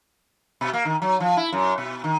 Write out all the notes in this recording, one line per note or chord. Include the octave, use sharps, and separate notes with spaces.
B2
A#3
D#3
F#3
F3
E4
F#2
B2
D#3